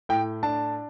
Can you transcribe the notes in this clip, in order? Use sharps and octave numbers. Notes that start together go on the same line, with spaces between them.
A2 G5
D4 A5